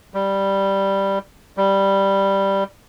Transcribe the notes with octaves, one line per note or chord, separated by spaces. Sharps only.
G3
G3